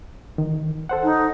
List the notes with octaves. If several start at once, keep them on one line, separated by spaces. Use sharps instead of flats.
D#3
A4 C5 F#5
D#4